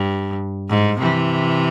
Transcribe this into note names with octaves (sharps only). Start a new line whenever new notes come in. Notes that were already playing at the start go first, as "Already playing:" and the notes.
Already playing: G2
G#2
C3 E3